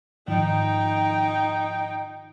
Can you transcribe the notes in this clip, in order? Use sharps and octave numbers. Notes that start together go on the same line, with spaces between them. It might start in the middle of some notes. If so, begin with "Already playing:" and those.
G#2 D#3 F3 D#4 G5